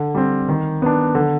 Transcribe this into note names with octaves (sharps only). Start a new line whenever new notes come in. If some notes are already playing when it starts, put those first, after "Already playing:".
Already playing: D3
G3 C4
D#3
B3 D4
D3